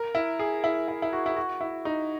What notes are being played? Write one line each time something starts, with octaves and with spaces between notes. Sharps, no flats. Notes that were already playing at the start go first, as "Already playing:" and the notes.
Already playing: A#4
E4
G#4
E4
E4
E4
F#4
E4
F#4
E4
D#4